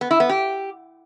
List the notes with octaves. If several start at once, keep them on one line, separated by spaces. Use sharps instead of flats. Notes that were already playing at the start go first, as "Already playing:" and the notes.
B3
E4
B3
G4